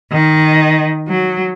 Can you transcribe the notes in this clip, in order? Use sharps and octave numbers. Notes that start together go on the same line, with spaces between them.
D#3
F#3